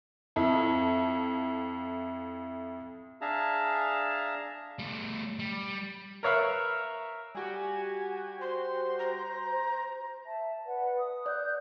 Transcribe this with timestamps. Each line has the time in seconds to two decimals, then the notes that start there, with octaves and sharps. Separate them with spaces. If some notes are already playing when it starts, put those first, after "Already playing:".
0.36 F2 E4
3.21 D4 G#4 E5 F5 A5 A#5
4.79 G3 A3
5.39 G3
6.23 A#4 B4 C#5 E5 F5 B5
7.35 G3 F#4 G4 G#5
8.41 C5 C6
8.99 A#5
10.25 E5 A5
10.65 B4 D5 F#5
10.99 D#6
11.26 D5 F#6 G6